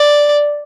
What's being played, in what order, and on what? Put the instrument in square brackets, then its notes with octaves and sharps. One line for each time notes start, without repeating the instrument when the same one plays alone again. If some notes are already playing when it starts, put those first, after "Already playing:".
Already playing: [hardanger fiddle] D5